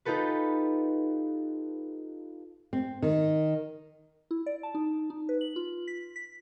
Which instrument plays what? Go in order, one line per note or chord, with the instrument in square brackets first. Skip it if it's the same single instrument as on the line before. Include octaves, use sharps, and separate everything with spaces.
[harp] D#4 F4 G4 A4 B4
[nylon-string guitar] C4
D#3
[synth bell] E4
D5
A5
D#4
D#4
B4
F#7
F4
B6
B6